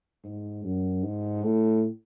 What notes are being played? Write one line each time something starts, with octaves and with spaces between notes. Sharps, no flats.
G#2
F#2
G#2
A2